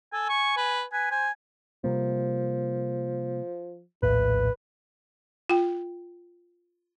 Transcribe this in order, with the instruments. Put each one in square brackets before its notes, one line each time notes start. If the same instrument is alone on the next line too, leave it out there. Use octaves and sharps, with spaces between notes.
[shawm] A4 [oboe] G#5
[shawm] C#6
B4
[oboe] B4 [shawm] G#5
[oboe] C5 [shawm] G#5
[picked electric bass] C3 G3 A#3 [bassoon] F3
[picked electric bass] A#1 D#2 A2 [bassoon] B4
[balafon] F4 G5